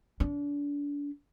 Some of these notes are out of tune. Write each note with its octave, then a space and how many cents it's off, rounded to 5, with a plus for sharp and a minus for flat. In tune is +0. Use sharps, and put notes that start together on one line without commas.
D4 -30